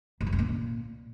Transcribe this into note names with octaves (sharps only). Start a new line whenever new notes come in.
G#2
F#2
C3
A#2